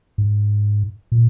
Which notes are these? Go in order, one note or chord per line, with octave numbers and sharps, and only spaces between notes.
G#2
A#2